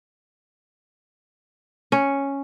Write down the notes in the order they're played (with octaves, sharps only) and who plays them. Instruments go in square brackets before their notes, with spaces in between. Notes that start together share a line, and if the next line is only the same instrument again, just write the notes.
[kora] C#4